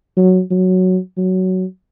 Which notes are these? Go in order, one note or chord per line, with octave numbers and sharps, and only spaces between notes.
F#3
F#3
F#3